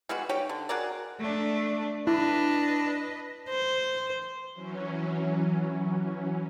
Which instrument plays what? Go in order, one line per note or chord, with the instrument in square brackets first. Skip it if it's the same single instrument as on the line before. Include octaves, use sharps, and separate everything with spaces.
[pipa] G3 G#3 B3 F#4
D#4 G4 C#5 G5
D3
F#4 G#4 A#4 D5
[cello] A3 D4
[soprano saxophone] D4 [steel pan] E4 [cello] B4 D#5
[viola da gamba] C5
[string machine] E3 F#3 C#4